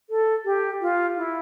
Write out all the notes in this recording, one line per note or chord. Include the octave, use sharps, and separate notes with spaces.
A4
G4
F4
E4